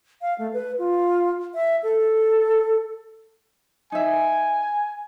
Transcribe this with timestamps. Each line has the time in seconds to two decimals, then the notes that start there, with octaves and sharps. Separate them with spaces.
0.21 F5
0.38 A3
0.53 B4
0.78 F4
1.54 E5
1.83 A4
3.92 D#4 E5 G#5